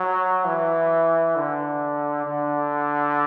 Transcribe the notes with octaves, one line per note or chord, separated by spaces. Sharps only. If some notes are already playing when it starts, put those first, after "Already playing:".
Already playing: F#3
E3
D3
D3